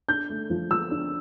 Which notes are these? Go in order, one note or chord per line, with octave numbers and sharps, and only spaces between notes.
D4 G6
A3
F3
F3 E6
D4